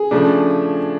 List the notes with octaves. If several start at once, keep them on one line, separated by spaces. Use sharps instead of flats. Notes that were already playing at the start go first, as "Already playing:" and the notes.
Already playing: G#4
C#3 F3 A3 D4